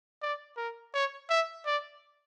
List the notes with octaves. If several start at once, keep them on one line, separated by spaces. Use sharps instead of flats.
D5
A#4
C#5
E5
D5